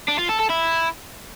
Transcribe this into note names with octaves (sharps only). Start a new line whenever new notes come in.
D4
F4
A4
A4
E4